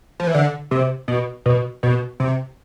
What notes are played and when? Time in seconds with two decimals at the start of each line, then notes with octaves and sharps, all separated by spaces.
0.20 F3
0.27 E3
0.35 D3
0.71 C3
1.08 B2
1.46 B2
1.83 B2
2.20 C3